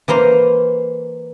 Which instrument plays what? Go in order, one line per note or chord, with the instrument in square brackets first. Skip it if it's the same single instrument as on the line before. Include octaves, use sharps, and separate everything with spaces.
[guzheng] E3 A#3 C5 A#5